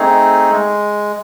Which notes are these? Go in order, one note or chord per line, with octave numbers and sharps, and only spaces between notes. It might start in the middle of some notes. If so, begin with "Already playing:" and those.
Already playing: A3 C4 D#4 G#4
G#3